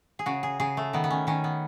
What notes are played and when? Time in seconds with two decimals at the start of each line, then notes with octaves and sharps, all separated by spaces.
0.19 G#4
0.26 C#3 F#4
0.43 G#4
0.60 C#3 G#4
0.77 A3
0.93 D#3 B3
1.04 B3
1.10 C#4
1.27 D#3 C#4
1.44 B3